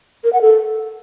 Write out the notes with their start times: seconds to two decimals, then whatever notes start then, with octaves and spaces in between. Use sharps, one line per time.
0.24 A#4
0.33 F#5
0.41 A4